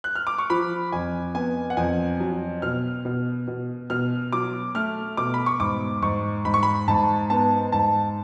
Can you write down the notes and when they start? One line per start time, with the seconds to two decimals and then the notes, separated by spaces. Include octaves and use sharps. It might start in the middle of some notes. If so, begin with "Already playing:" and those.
0.04 F#6
0.15 F6
0.27 D6
0.38 C#6
0.50 F3 B5
0.92 F2 G#5
1.35 B3 G#5
1.70 F#5
1.77 F2 G#5
2.20 F#3
2.62 B2 F6
3.05 B2
3.47 B2
3.90 B2 F6
4.32 F#3 D6
4.75 A3 F6
5.17 B2 D6
5.34 B5
5.46 C#6
5.60 G#2 D6
6.02 G#2 C#6
6.45 G#2 B5
6.54 C#6
6.63 B5
6.88 G#2 A5
7.30 B3 A5
7.72 G#2 A5